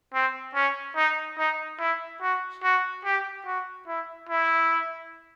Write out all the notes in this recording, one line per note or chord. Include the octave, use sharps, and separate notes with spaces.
C4
C#4
D#4
D#4
E4
F#4
F#4
G4
F#4
E4
E4